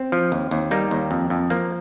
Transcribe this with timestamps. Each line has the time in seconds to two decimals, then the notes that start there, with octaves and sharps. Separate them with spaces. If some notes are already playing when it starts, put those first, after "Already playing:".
Already playing: C4
0.12 F3
0.32 D#2
0.51 D#2
0.71 G3 A#3 D#4
0.91 D#2
1.11 F2
1.30 F2
1.50 F3 A#3